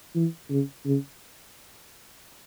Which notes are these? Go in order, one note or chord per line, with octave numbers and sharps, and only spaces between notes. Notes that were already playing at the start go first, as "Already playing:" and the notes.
E3
C#3
C#3